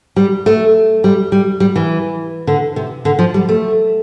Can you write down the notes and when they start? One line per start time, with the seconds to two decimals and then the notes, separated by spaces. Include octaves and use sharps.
0.16 G3
0.46 A3
1.04 G3
1.32 G3
1.60 G3
1.76 E3
2.47 D3
2.76 C3
3.05 D3
3.19 F3
3.34 G3
3.49 A3